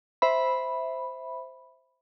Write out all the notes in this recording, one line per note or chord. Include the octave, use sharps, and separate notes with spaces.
C5 E5 B5